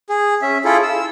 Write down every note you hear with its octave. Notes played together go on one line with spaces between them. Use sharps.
G#4
C#4 E5
E4 F4 G#4 A4
E6